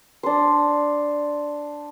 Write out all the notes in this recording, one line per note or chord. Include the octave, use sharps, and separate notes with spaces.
D4 C5